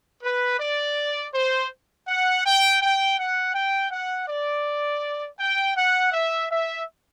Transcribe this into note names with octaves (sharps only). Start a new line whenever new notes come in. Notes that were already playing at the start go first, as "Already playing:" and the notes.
B4
D5
C5
F#5
G5
G5
F#5
G5
F#5
D5
G5
F#5
E5
E5